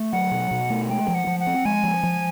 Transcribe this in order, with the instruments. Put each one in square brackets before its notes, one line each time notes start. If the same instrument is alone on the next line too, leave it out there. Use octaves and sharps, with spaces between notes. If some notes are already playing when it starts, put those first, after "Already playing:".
Already playing: [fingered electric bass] A3
[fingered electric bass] F#3 [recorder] F#5
[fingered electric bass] B2
B2
A3
[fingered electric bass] G#3 [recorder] G5
[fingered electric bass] F3
[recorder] F#5
[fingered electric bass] F3
[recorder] F#5
[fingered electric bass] C4
[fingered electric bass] G#3 [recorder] G#5
[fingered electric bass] F3
F3